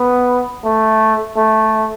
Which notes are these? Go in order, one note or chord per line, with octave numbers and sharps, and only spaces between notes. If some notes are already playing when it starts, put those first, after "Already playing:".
Already playing: B3
A3
A3